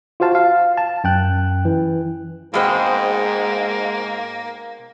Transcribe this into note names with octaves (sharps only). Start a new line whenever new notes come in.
F4 F#4 C5 F5 A5
F5
A5
F#2 G5 F#6
E3
G#2 B2 G#3 A#3 C4